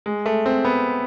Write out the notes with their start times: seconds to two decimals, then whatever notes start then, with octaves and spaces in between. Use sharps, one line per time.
0.06 G#3
0.26 A3
0.46 C4
0.65 B3